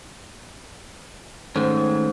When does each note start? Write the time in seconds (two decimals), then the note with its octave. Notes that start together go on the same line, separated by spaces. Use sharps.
1.56 G#2 D#3 A3 C#4